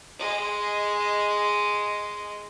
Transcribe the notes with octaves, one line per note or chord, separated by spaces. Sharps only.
G#3 D#5